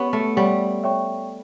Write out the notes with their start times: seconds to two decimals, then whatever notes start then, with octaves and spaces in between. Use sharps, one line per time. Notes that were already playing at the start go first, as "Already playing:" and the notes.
Already playing: B3 C#4 G4 C#5 F#5 C#6
0.13 A3
0.36 G3 G4 C#5 F#5 C#6
0.83 C#5 E5 G5 C#6